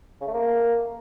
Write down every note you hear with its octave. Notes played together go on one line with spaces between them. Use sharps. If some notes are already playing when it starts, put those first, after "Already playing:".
C#3
A3
A#3